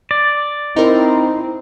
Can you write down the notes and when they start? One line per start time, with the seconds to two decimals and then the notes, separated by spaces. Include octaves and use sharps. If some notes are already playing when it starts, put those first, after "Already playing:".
0.11 D5
0.76 C4 D#4 E4 A#4